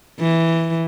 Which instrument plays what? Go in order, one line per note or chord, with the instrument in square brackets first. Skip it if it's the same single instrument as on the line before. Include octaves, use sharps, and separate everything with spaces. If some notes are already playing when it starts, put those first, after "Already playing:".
[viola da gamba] E3